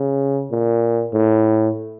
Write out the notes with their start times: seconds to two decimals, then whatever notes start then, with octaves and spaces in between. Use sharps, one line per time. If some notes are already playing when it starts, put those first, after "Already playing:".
Already playing: C#3
0.51 A#2
1.13 A2